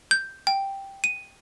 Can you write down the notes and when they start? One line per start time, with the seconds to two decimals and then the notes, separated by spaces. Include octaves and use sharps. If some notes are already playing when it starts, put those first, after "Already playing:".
0.11 G6
0.47 G5
1.04 D#7